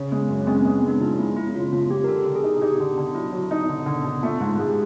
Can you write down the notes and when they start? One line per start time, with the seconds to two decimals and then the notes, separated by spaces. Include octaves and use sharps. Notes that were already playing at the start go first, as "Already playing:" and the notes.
Already playing: C#3
0.12 G#3
0.29 F#2
0.42 C#4
0.47 G#3 C4
0.61 B3
0.65 G#3
0.83 G#3 D4
1.01 F3 D#4
1.19 G#3 E4
1.36 G#3 E4
1.55 C#3 F4
1.72 F3 F4
1.90 F3 G4
2.04 A#4
2.08 D3 A4
2.26 D3
2.35 G#4
2.44 D#4
2.62 D#4 G4
2.80 D3
2.97 D3
3.15 F#3 E4
3.33 F#3
3.42 E4
3.51 D#4
3.69 D3
3.86 D3
4.04 D3
4.23 A3 F4
4.40 G#2
4.49 F4
4.58 G#2 G#4
4.68 G4